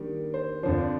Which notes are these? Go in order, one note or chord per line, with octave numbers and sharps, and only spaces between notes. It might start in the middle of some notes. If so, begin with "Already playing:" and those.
Already playing: D#3 G3 A#3 D4
C5
F2 D3 F3 C5
D5